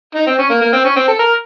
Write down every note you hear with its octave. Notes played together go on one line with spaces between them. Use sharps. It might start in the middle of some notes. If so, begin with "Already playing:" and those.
D#4
C4
C#4
A#3
A#3
C4
C#4
C4
A4
A#4